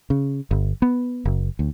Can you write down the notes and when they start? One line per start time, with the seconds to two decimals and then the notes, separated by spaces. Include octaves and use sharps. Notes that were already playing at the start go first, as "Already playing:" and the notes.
0.10 C#3
0.51 G1
0.82 B3
1.25 F#1
1.59 D2